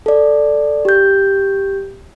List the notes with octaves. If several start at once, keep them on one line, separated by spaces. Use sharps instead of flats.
A4 D5
G4 G6